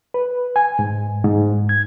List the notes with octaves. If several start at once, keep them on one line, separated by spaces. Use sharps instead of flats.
B4
G#5
G#2
G#2
G#6